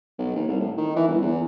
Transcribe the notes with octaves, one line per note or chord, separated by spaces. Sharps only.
B1
D#2
C2
A2
D#3
E3
G1
E2